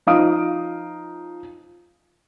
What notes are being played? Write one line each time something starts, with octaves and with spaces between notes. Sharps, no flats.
F3 D#4 F5 D#6 D7